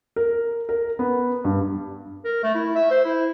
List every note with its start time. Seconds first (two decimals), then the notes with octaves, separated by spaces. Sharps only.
0.16 A#4
0.69 A#4
0.99 B3
1.44 G2
2.24 A#4
2.43 A3
2.55 E4
2.75 E5
2.91 C5
3.04 E4